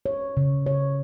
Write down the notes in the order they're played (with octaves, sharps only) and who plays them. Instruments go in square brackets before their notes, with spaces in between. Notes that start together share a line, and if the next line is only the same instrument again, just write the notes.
[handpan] C#5
C#3
C#5